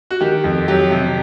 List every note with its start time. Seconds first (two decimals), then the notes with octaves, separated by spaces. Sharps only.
0.11 F#4
0.21 D#3 G4
0.44 F2
0.68 F#3 G4
0.90 C3